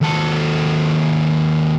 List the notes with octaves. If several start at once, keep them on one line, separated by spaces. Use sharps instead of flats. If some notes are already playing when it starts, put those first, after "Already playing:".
D#2 A4